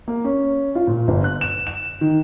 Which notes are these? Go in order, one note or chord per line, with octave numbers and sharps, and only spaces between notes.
A#3
C#4
F4
A#2
G1
F#6
E7
E7
D#3